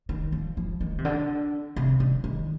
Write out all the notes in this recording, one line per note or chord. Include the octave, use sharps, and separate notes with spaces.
D#3
F3
F3
D#3
C3
D3
C3
D3
D#3